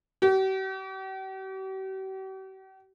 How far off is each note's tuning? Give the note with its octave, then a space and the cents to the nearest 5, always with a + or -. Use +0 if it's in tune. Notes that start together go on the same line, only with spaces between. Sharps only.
G4 -45